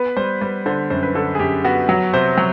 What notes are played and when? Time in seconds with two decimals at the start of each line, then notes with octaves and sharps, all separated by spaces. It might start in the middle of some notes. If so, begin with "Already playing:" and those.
Already playing: B3 B4
0.17 G3 C5
0.41 G3 B4
0.66 D3 C5
0.90 F#2 C5
1.03 B4
1.15 D3 A4
1.35 G#4
1.39 F#2 G4
1.65 B3 F#4
1.89 F#3 F#4
2.13 C3 C5
2.38 F#3